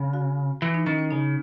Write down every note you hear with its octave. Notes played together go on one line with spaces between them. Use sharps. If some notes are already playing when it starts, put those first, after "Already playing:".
Already playing: C#3
F#4
E3 E4
D#4
D#3 C#4
C#4
C#3 D#4